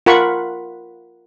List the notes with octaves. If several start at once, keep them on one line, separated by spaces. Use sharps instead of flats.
F4 A#4 F#5 B5 C#6